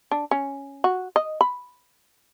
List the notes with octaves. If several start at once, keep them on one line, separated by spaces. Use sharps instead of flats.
D4
C#4
F#4
D#5
B5